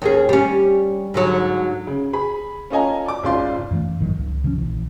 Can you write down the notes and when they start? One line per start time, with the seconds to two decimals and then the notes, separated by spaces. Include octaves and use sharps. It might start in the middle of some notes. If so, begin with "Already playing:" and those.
0.02 D#2 C#4 G#4
0.29 G3 C#4
1.14 G#2 D3 F#3
1.87 C#3
2.13 G#4 B5
2.70 C#4 F4 A4 D#5 G#5 A#5
3.06 D5 D6
3.23 G#1 C#3 F4 D5 C6
3.71 F#2 E3 A3
3.99 G1 A2 D#3 F#3
4.16 C#2
4.44 C#3 F3 B3 C#4
4.58 A#1 E3